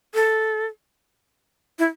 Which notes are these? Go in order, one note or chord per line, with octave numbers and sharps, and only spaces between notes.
A4
E4